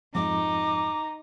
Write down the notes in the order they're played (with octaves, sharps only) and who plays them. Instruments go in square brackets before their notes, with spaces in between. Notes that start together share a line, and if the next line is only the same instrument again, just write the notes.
[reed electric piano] F2 G#2 [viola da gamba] D#4 [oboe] A#5 [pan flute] D6